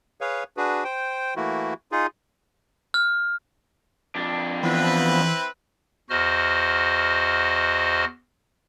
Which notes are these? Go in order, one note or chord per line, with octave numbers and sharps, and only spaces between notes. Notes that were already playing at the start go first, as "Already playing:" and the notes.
G#4 B4 C#5 F5
D4 F#4 G#4 B4
C5 G5
E3 A3 A#3 E4 F#4
D#4 F4 G#4
F6
F2 D4
E3 F3 B3 C4 E4 B4
E2 F#4 C5 D#5 F6